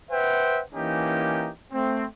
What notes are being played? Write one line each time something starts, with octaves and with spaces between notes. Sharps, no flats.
B4 C5 E5 F#5 G5
E3 A#3 C#4 D#4 G4
A3 C4